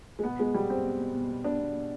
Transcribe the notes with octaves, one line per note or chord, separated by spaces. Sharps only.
G#3
B2 B3
B2 G#3
B2 G3
B2 C4
B2
B2
B2
B2
B2 D4
B2
B2